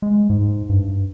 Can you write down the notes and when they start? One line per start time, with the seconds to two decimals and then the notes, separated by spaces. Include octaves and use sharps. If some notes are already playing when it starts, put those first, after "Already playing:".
0.02 G#3
0.30 G#2
0.69 G2